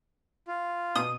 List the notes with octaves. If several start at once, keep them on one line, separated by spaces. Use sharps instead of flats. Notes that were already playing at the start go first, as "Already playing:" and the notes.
F4
B2 D#6